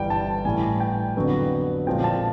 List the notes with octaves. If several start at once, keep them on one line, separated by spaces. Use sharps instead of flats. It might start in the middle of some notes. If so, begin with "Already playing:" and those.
Already playing: G1 G2 E3 G3 G5
A5
A2 E3 G3 G#5
G5
F2 D3 F#3 B3
A#1 A#2 F3 G#3 C4 G5
A5